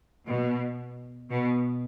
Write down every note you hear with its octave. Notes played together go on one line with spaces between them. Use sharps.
B2
B2